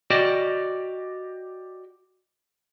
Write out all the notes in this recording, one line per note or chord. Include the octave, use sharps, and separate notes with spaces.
F#4 G4 D5 D#5